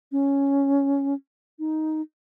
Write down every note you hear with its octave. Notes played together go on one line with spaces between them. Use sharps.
C#4
D#4